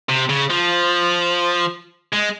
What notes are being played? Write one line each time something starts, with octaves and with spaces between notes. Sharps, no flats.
C3
C#3
F3
G#3